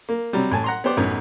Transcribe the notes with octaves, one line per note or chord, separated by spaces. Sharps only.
A#3
C3 F#3 G3
A1 G#5 A5
F#5 A#5 C6
B3 G4 C5 D5
A1 F#2 B3 C#4 D#4